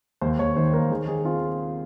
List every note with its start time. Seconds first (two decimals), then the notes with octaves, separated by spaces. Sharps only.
0.21 D#2 C5
0.39 D#2 C#5
0.56 D#3 C5
0.73 A#3 A#4
0.91 D#3 G#4
1.08 D#3 G#4
1.25 C4 F4